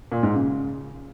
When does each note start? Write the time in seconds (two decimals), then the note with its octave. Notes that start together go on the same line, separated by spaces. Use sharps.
0.12 A#2
0.23 G#2
0.35 C#3